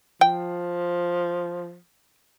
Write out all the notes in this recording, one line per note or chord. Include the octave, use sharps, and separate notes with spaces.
F3 G5